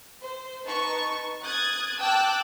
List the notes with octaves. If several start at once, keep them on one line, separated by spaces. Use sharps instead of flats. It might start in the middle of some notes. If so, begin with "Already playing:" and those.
C5
D#4 B4 A5 C#6
D#6 F#6 G#6 A6
G5 A5 D6 E6 F#6